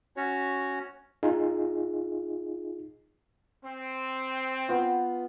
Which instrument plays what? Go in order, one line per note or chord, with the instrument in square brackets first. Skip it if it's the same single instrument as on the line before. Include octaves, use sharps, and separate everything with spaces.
[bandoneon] C#4 F#4 C#5
[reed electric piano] D#4 F4 G#4
[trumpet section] C4
[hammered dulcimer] B3 F4